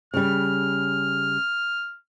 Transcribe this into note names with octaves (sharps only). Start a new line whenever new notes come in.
C#3 G3 F6